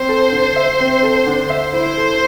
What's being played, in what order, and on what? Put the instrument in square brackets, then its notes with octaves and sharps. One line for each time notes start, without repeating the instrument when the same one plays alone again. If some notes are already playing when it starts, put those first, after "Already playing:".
Already playing: [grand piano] C4 [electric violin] C5
[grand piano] A4
D3
E5
C4
A4
D3
E5
[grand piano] E4 [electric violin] C5
[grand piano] A4